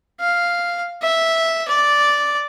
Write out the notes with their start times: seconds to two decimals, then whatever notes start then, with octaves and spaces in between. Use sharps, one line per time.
0.20 F5
1.02 E5
1.68 D5